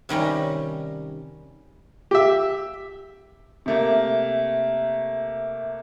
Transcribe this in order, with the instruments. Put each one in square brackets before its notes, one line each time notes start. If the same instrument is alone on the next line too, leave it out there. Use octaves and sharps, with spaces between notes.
[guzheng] C3 D#3 G3 C#4
[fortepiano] G4 E5
[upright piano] C3 A3 A#3